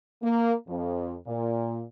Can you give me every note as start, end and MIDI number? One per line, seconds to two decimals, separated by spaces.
0.22 0.54 58
0.68 1.15 41
1.27 1.83 46